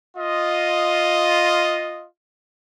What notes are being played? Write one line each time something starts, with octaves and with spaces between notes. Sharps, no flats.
F4 D#5